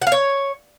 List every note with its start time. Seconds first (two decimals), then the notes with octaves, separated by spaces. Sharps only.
0.02 F#5
0.07 F5
0.12 C#5